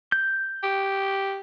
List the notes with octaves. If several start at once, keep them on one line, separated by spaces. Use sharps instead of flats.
G6
G4